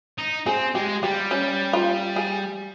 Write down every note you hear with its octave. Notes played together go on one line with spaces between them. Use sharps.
D#4
C4 G#4
G#3 G4
G3 G4
C#4
F4
G#4